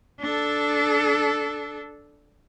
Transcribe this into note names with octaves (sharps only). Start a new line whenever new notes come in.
D4 A4